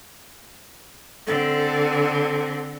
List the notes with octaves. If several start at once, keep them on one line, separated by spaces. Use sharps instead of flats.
D3 C4 A4